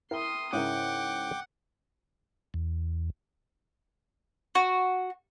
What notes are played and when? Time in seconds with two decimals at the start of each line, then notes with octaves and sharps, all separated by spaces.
0.11 E4 A#4 G5 C6 D#6
0.53 G#2 C#3 C#4 E4 A#4 F#5 G5 D6
2.54 E2
4.55 F#4